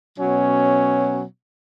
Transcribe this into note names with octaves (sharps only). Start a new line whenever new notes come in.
B2 F#3 C#4